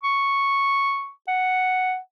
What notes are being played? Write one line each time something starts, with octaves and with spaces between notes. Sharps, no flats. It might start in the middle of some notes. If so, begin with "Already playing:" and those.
C#6
F#5